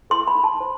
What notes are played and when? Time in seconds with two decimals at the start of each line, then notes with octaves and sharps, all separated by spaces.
0.10 A4 C6
0.27 B5
0.35 D#4
0.44 A5
0.60 C5